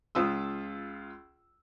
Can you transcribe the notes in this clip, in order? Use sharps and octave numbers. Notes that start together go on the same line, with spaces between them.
C#2 F4 D#6 E6